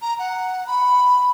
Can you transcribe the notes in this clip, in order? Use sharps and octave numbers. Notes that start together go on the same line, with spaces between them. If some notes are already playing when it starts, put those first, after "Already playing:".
A#5
F#5
B5